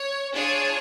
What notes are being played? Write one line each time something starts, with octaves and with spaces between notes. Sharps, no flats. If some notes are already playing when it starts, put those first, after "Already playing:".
Already playing: C#5
D4 F4 G#4 C#5